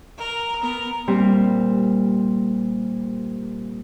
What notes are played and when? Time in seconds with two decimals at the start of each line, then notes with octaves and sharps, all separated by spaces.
0.18 A#4
0.60 B3 A#4
1.07 A#2 G3 C4